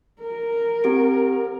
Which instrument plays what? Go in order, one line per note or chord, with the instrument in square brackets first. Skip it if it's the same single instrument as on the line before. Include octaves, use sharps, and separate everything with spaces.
[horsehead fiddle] A#4
[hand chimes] C4 G4 D7